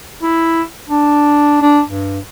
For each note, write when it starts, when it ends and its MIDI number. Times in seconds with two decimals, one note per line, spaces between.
0.22 0.63 64
0.89 1.60 62
1.62 1.81 62
1.89 2.19 43